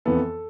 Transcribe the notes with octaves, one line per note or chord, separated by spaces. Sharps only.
F2 E3 B3 A4